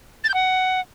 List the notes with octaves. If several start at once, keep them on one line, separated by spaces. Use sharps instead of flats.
A6
G6
F#5